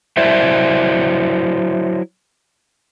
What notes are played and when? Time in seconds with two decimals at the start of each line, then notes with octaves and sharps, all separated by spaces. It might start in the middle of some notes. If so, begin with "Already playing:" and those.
0.17 F#3 E4 C5 D5 E5